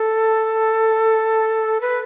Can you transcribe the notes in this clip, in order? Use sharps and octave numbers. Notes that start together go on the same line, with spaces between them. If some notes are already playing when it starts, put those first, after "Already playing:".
Already playing: A4
B4